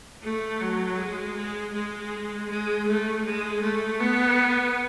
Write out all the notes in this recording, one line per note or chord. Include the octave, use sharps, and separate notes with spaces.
A3
F#3
G#3
G#3
G#3
G#3
A3
G#3
A3
B3